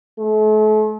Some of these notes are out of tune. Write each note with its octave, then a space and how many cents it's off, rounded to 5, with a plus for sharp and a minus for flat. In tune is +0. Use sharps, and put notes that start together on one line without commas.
A3 -40